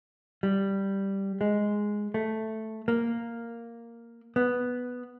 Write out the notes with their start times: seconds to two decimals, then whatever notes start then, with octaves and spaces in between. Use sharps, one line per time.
0.43 G3
1.41 G#3
2.14 A3
2.88 A#3
4.36 B3